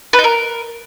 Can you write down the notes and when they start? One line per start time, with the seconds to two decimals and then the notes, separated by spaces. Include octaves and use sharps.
0.13 B4
0.19 D#4
0.24 A#4